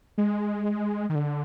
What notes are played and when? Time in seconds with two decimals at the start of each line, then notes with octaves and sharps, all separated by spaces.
0.18 G#3
1.10 D#3
1.15 D3